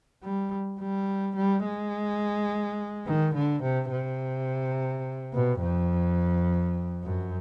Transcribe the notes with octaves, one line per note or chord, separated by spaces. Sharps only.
G3
G3
G3
G#3
D#3
D3
C3
C3
B2
F2
F#2